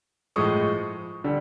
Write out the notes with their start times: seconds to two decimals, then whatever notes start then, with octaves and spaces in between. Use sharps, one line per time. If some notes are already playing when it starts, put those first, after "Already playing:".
0.36 A2 F3 G#3 C#6 D#6
1.24 D3 G3